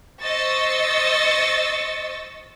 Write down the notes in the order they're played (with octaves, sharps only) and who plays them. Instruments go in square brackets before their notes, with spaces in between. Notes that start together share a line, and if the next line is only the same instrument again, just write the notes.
[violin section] C5 D#5 C#6 E6 A6